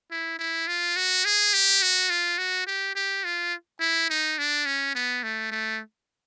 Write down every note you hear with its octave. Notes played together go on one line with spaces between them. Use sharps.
E4
E4
F4
F#4
G#4
G4
F#4
F4
F#4
G4
G4
F4
E4
D#4
D4
C#4
B3
A3
A3